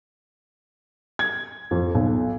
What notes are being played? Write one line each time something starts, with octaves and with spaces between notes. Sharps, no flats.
G#6
F2
B1